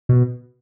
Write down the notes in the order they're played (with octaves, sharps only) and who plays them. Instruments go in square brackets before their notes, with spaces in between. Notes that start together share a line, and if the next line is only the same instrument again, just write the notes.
[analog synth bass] B2